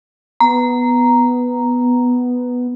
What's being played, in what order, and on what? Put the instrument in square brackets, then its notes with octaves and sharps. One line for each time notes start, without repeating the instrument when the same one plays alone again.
[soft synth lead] B3 [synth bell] A#5